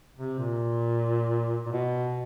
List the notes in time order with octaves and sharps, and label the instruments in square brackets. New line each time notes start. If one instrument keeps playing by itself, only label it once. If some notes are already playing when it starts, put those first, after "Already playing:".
[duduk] C3
A#2
A#2
B2